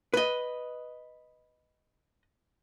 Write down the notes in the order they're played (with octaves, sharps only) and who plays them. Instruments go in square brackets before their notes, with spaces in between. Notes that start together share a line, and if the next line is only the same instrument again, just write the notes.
[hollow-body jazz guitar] B4 D#5